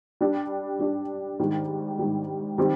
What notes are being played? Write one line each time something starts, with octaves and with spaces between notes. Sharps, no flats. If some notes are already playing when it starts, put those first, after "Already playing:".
G3 D4 G4
G3 D4 G4
G#2 D#3 G3
G#2 D#3 G3
D#3 G3 C4 G4